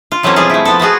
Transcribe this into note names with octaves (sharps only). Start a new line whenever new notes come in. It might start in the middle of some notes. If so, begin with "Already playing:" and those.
F4
E3 F#3 A3 A#3 C4 C#4
B2 F3 G3 C4 F4 G#4
A3 E4
F3 B3 A4
B3 F4 F#4 G#4